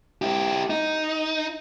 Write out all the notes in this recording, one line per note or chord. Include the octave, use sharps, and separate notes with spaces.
E4 G4
D#4